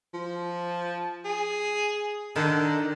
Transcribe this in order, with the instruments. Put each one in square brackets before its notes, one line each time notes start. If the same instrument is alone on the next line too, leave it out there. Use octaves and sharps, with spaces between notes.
[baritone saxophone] F3
G#4
[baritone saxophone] D3 [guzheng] D#3